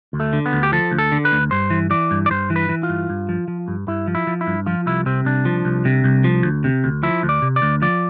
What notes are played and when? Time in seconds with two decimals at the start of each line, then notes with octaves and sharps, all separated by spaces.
0.13 D2
0.20 A3
0.33 D3
0.46 B3
0.53 D2
0.63 G4
0.72 F3 A4
0.92 D2
0.98 A4
1.12 D3
1.25 B4
1.32 D2
1.51 G2 C5
1.70 E3
1.90 E3 D5
2.11 G2
2.26 D5
2.30 G2 C5
2.50 E3
2.56 B4
2.69 E3
2.83 F4
2.89 G2
3.10 G2
3.29 F3
3.48 F3
3.68 G2
3.88 G2 E4
4.07 F3
4.15 E4
4.27 F3
4.41 E4
4.47 G2
4.66 F3 F4
4.86 C2 E4
5.06 C3 C4
5.25 C2 D4
5.45 F3
5.65 C2
5.85 C3
6.04 C2
6.24 F3
6.44 D2
6.64 C3
6.84 D2
7.03 F3 E4
7.23 D2
7.29 D5
7.42 C3
7.56 D5
7.62 D2
7.82 F3 D5